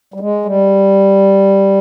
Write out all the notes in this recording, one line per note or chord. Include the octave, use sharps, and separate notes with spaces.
G3
G#3
G3